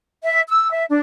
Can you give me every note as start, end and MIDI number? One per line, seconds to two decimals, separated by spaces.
0.24 0.41 76
0.48 0.71 88
0.71 0.83 76
0.90 1.00 62